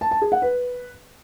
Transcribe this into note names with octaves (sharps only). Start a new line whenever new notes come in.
A5
A5
G#4
F#5
B4